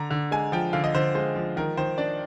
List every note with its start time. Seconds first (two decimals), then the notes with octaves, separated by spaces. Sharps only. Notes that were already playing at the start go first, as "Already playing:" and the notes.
Already playing: D3 A#5
0.10 D3
0.31 G#3 G#5
0.52 F3 G5
0.73 D3 F5
0.84 D#5
0.94 D3 C5
1.15 G#3 C5
1.36 F3
1.57 D#3 A#4
1.77 D#3 C5
1.98 D4 D5